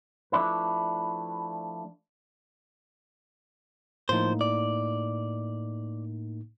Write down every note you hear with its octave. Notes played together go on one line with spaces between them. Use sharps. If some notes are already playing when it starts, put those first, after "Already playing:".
F3 A3 D4 E4 B4
A2 F3 A#3 D#4 C5
D5